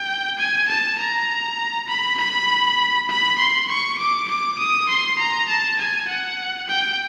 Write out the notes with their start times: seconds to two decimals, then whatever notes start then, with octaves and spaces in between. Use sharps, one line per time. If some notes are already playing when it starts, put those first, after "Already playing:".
Already playing: G5
0.38 G#5
0.68 A5
0.99 A#5
1.88 B5
2.18 B5
3.09 B5
3.38 C6
3.69 C#6
3.98 D6
4.28 D6
4.58 D#6
4.89 C6
5.18 A#5
5.48 A5
5.79 G#5
6.08 F#5
6.68 G5